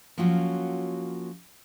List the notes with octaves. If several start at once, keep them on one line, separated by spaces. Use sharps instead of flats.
F3 F#3 A#3 C#4 F4 F#4